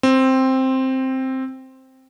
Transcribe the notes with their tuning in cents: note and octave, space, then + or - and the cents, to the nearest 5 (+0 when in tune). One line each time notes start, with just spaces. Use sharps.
C4 +5